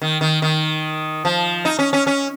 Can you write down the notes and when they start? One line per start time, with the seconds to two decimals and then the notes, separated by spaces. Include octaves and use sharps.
0.02 D#3
0.21 D#3
0.42 D#3
1.25 F3
1.65 D#4
1.79 C#4
1.93 C#4
2.07 C#4